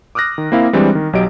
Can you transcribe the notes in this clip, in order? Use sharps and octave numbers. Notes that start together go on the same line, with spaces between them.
D6 D#6 F6 F#6 A#6
D#3
A#3 C4 E4 F5
E3 G3 G#3 C4 D4
D#3
B1 F#3 G4 D#5 D7